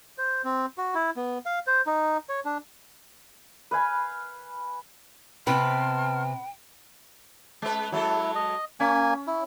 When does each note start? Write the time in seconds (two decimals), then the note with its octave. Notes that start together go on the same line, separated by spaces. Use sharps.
0.18 C5
0.45 C4
0.78 F#4
0.95 E4
1.17 B3
1.46 F5
1.67 C5
1.87 D#4
2.29 C#5
2.45 D4
3.71 B4 F5 G#5 B5
5.47 C3 B3 C4 B4 G5 A5 C6 F6
7.62 G#3 B4
7.92 F#3 G#3 E4 A4
8.35 D#5
8.80 A#3 C#4 G#5
9.27 E4